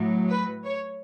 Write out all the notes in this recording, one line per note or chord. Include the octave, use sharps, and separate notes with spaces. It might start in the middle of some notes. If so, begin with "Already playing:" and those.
Already playing: A2 F#3
B4
C#5